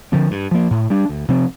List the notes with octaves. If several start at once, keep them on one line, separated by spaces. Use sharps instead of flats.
D3 F3 C4
G2
F3 A#3
A2
G3 D4
D2
C3 F3 C4